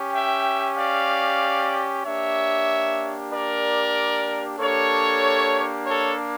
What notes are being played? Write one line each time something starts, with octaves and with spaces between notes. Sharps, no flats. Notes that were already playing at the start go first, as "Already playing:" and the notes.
Already playing: C#4 G4
E5 G5
D5 F5
A#3 D4 G4 C#5 E5
A#4 D5
A#3 D4 G4 A4 C#5
A4 C#5